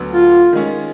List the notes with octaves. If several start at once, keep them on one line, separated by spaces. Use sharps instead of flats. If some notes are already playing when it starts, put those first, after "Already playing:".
Already playing: D2 D3 F#3 B3
F4
D#3 G#3 C#4